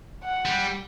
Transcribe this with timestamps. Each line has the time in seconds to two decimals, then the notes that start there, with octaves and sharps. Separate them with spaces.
0.24 F#5
0.45 G3